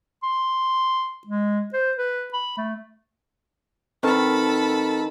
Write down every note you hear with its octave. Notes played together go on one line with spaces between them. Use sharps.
C6
G#3
C5
B4
B5
A3
D#3 C4 A4 B4 A5 B5 F6